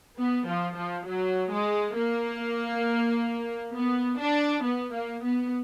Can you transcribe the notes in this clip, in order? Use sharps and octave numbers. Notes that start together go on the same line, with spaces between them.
B3
F3
F3
F#3
G#3
A#3
B3
D4
B3
A#3
B3